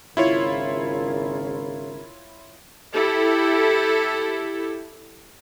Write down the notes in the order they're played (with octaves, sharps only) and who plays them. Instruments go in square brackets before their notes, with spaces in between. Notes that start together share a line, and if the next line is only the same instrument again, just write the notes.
[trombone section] G#1 C#3 A#4 [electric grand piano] E4 F4 C#5
[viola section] E4 G4 A4